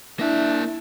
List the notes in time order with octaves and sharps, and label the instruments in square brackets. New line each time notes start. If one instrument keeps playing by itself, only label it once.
[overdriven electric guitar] A#3 E5 [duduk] D4 [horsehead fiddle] E4